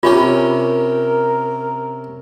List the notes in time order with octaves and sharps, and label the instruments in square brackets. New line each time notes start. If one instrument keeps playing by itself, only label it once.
[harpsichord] C3 C#4 G4 [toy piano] F4 [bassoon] A#4